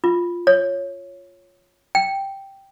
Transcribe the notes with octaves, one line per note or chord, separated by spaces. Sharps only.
F4
C#5
G5